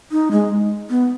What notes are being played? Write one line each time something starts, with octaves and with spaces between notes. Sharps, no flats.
D#4
G#3
B3